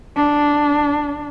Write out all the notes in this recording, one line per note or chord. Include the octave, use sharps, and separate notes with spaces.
D4